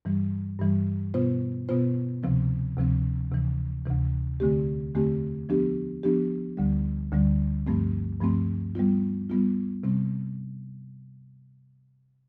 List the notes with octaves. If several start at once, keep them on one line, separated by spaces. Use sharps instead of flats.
G2 E3 G3
G2 E3 G3
B2 B3 F4 C5
B2 B3 F4 C5
D2 C3 F3 C4
D2 C3 F3 C4
D2 C3 E3
D2 C3 E3
E2 D3 A3 C4 G4
E2 D3 A3 C4 G4
F3 B3 D4 G4
F3 B3 D4 G4
D2 D3 G3
D2 D3 G3
G2 F3 A3 C4
G2 F3 A3 C4
G3 B3 F4
G3 B3 F4
C3 G3 C4